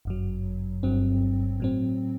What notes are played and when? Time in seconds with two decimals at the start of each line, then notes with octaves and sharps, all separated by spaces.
0.05 G1 F#2 F#3
0.83 G1 G2 F#3 C4
1.60 A2 F#3 C4